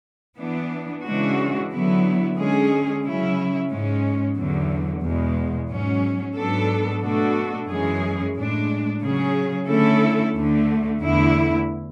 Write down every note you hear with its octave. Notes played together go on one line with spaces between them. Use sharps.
E3 B3 D4
C#3 E3 G#3 D4 F#4
D3 F#3 B3 E4
D3 G#3 C#4 G#4
C#3 F#3 C#4 E4
G#2 G#3 C#4
E2 D3 F#3
E2 B2 G#3
G#2 F#3 C#4
G#2 F#3 B3 D4 A4
B2 A3 D4 F#4 A4
F#2 E3 G#3 C#4 G#4
A2 G#3 D4
C#3 F#3 C#4 G#4
D3 A3 C#4 E4 A4
D2 D3 A3
E2 D3 A3 E4